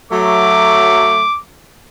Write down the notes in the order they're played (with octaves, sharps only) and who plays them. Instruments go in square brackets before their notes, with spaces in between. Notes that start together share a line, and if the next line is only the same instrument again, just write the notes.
[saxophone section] F#3 A3 [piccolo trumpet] D6